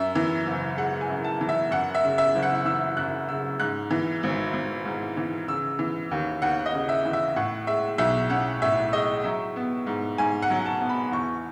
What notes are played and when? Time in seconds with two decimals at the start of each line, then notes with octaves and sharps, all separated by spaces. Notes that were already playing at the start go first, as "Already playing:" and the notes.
Already playing: F#2 E5
0.15 E3
0.46 F#1
0.77 G#3 F#5
1.01 G#5
1.10 F#2
1.24 A5
1.41 E3
1.49 E5
1.71 F#2 F#5
1.95 E5
2.03 C#3
2.18 E5
2.35 F#1
2.42 F#5
2.65 E3 E6
2.97 F#2 F#6
3.29 C#3 E6
3.60 G#2 F#6
3.91 E3
4.23 G#1
4.53 G#1
4.85 G#2
5.17 E3
5.48 C#3 E6
5.79 E3
6.11 D#2
6.42 D#2 F#5
6.66 D#5
6.73 C#3
6.89 E5
7.05 E3
7.13 E5
7.36 A2 F#5
7.67 G#3 E5
7.98 B1 E5
8.30 C#4 F#5
8.62 A2 E5
8.93 G#3 D#5
9.24 F#3 E5
9.56 B3
9.87 G#2
10.18 G#2 G#5
10.42 F#5
10.50 F#3
10.66 A5
10.81 B3
10.89 B5
11.12 E2 C#6